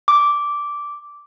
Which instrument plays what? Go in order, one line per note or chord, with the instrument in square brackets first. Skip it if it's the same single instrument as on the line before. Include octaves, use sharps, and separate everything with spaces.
[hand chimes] D6